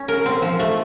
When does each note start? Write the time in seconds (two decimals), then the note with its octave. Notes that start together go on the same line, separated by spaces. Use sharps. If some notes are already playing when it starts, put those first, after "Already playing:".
Already playing: C#4
0.08 A#4
0.26 C4
0.42 F3
0.60 A3